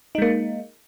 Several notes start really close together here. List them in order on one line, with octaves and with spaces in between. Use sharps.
D#4 G#3 A#3